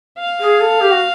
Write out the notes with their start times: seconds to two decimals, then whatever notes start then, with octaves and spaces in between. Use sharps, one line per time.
0.19 F5
0.40 G#4
0.60 A4
0.80 G4
0.91 F#4